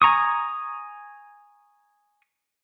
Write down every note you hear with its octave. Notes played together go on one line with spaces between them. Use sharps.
G#5 A#5 C#6 D#6